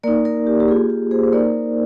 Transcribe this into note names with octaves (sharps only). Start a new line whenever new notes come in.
A#3 D#4 A#4 D5
A#4 D5
G4
G4
A#3 F4 G#4
G#4
G#4 C5
C5
A#3 D#4 A#4 D5